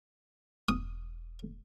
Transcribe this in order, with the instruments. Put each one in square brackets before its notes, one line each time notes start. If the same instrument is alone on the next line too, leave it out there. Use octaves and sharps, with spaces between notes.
[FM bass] E1 [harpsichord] D#6